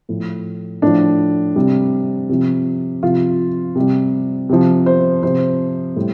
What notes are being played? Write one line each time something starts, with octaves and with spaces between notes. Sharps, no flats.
A2 F3
A2 F3 D4
C3 G3
C3 F3
C3 F3 F4
C3 G3
C3 F3
C5
C3 F3 C5
A2 G3